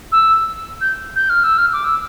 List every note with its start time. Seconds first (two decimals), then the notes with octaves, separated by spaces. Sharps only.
0.12 E6
0.81 G6
1.16 G6
1.30 F6
1.44 E6
1.58 F6
1.73 D6
1.85 E6